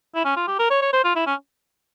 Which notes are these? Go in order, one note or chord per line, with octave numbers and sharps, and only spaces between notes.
E4
C#4
F4
G4
A#4
C#5
C#5
C5
F4
E4
C#4